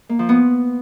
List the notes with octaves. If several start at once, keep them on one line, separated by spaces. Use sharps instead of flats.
A#3
F3
B3